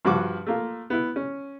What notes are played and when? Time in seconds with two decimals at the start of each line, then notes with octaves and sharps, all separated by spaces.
0.05 G2 F3 F#4 D6
0.46 A3 A#3 F4
0.90 B3 E4
1.16 C#4